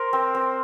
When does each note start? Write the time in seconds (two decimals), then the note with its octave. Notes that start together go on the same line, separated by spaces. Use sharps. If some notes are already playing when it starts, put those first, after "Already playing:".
Already playing: A#4 C5
0.13 C4
0.35 C4